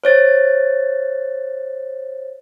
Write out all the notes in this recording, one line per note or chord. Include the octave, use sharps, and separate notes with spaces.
C5 C#5 A6